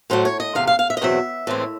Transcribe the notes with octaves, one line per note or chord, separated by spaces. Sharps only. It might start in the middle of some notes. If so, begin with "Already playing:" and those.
A2 F#3 A3 C5
C#5
D#5
E2 C3 F5
F5
F5
E5
D#5
E2 B2 F#3 C4 E5
A2 E3 G#3 C4